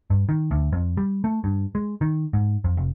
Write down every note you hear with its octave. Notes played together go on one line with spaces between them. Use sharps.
G2
D#3
D2
F2
G3
A3
G2
G#3
D#3
G#2
F2
F1